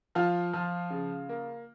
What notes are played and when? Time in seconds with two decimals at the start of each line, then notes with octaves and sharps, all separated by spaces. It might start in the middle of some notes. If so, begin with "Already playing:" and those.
0.15 F3 F4
0.53 F3
0.90 C#3
1.29 A#3